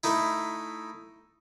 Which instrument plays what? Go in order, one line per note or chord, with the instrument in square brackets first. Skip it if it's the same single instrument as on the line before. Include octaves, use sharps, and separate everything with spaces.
[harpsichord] A3 D#4 E4